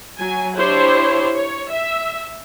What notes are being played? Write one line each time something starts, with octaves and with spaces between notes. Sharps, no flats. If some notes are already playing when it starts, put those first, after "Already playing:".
F#3 G#5
D4 E4 G4 C5 C#5
C#5
E5